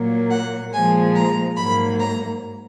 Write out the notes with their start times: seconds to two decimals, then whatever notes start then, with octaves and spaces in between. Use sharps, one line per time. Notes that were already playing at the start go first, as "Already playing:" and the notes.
Already playing: A#2 F#3 A#3
0.31 F#5
0.73 A#2 F3 G#3 G#5
1.15 A#5
1.56 G#2 F#3 A#3 B5
1.99 A#5